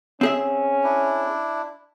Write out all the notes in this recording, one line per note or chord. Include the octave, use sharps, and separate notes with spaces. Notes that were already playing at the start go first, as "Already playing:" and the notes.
C4 C#4 G#4 E5
D4 E4